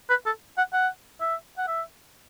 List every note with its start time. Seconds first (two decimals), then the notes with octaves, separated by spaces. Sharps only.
0.10 B4
0.26 A4
0.58 F#5
0.73 F#5
1.21 E5
1.58 F#5
1.68 E5